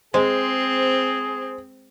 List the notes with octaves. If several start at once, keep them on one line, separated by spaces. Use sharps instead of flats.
G#3 C4 G#4 C5